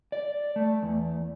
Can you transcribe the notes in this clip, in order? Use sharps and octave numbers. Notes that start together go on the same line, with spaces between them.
D5
A3
E2